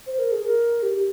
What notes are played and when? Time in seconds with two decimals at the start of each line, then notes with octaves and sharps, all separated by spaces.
0.07 C5
0.19 A#4
0.32 G#4
0.44 A#4
0.83 G4